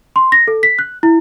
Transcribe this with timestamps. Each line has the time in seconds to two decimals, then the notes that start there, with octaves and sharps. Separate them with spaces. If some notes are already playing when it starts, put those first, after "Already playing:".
0.16 C6
0.32 A#6
0.48 A4
0.63 B6
0.79 F#6
1.03 E4